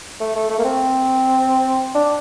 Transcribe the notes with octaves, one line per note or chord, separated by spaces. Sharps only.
A3
A3
A3
A#3
C4
D4